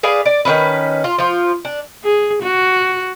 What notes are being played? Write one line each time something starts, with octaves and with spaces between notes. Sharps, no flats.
G#4 B4 D5 F5
D5
D#3 B3 C#4 B4
F4
F3 F4
D4
G#4
F#4